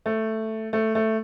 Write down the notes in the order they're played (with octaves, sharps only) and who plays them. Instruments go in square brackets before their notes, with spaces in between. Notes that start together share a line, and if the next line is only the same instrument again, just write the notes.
[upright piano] A3
A3
A3